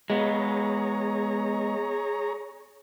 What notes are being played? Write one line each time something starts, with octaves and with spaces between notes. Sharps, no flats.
G#3 B3 G#4 C#5 A#5